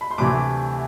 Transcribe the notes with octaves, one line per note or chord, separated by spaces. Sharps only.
B5
C6
D2 C3 E3 A3 B5 D6